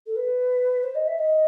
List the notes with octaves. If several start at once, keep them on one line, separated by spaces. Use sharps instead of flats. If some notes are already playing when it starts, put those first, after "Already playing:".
A4
B4
C5
D#5
E5
D#5